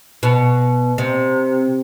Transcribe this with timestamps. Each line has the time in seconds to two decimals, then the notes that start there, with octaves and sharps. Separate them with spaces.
0.23 B2
0.98 C3